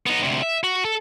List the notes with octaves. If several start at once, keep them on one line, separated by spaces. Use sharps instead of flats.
B3 D#4
D2 C3
E5
F#4
A4